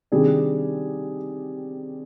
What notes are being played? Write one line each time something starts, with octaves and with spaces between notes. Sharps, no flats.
C3 D#3 G3 D4 G#4